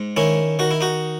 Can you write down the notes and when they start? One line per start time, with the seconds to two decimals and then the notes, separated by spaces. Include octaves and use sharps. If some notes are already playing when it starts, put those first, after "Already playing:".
Already playing: G#2
0.16 D#3 C#4 E4
0.59 D#3 F#4
0.71 E4
0.81 D#4 F#4